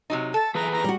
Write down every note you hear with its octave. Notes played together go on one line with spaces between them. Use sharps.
C3 F#3 D#4
A4 A5
E3 G#4 B4 A#5
A#5
G3 F#4